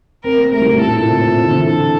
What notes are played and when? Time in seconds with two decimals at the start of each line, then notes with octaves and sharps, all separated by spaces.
0.24 C4 A#4
0.38 A#3
0.52 A3 A#4
0.62 G3
0.72 A2
0.81 A#2 A4
0.90 A2
0.99 A#2
1.09 C3
1.18 A2
1.38 C3
1.48 D3
1.56 E3
1.66 A4